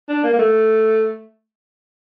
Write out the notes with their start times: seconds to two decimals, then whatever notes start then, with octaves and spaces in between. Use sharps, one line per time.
0.09 D4
0.24 A#3
0.34 A#3
0.39 A3